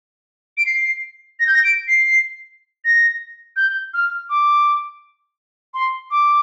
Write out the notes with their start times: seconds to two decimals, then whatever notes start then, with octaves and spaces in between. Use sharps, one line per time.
0.57 D7
0.66 C7
1.40 A#6
1.47 G6
1.54 A#6
1.64 D7
1.88 C7
2.85 A#6
3.56 G6
3.94 F6
4.29 D6
5.74 C6
6.11 D6